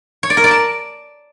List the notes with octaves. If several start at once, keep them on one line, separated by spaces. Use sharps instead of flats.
C#5
D5
A#4
D5
A5